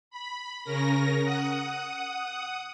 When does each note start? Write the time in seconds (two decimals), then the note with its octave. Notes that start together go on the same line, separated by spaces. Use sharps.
0.11 B5
0.64 C#3 C#4 A#4 A#6
1.22 F#5 D#6